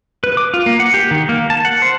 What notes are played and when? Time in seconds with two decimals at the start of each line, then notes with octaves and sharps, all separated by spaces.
0.24 B4
0.37 D6
0.54 F4
0.66 A#3
0.80 F#5
0.94 G4
1.11 D#3
1.29 A#3
1.50 A5
1.65 F#5
1.82 C5